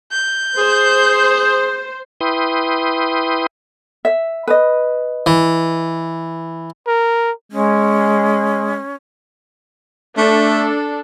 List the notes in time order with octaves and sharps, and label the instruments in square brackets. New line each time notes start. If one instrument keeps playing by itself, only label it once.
[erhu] G6
[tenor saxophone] G#4 [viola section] C5
[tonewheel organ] E4 B4 G5 C6 D#6
[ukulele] E5
B4 D#5
[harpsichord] E3
[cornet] A#4
[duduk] G#3 [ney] C#4
[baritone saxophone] A3 [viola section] D4 A4